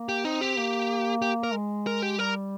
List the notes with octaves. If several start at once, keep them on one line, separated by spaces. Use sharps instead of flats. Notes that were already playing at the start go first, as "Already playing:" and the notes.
Already playing: A#3
G4
C4 D#4
G4
A#3
G4
A#4
G#3
A#4
G4
G3 A#4